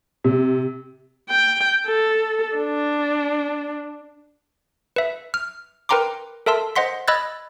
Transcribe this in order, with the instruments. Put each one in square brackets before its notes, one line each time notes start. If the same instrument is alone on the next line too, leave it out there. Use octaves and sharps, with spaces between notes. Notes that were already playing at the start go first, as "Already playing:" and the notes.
[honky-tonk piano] C3
[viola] G5
A4
D4
[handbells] B4 E5
F6
A#4 B4 G5 A#5 C6 D6
A4 A#4 E5 A5 C6 E6
C5 D#5 F#5 C6 B6
D#5 B5 E6 F#6 G#6 A6